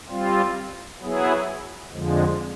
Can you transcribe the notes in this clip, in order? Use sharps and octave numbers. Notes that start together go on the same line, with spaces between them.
G3 C4 F4
F#3 B3 E4 G#4
F2 D3 F3 G#3